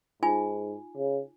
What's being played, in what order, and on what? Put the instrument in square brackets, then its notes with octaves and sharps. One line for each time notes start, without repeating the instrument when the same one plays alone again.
[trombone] G#2 [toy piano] D#4 F4 G#5
[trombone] C#3